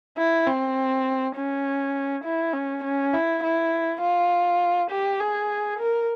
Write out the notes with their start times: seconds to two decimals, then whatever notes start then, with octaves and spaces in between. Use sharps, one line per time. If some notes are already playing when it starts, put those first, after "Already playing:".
0.18 E4
0.47 C4
1.36 C#4
2.24 E4
2.54 C#4
2.84 C#4
3.13 E4
3.43 E4
4.02 F4
4.91 G4
5.20 G#4
5.79 A#4